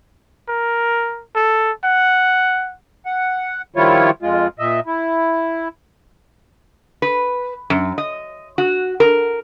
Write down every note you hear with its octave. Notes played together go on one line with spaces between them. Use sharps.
A#4
A4
F#5
F#5
D#3 F3 G3 E4 F4 C#5
F2 G#3 F4
A#2 D#5 E5
E4
B4
F#2
D#5
F#4
A#4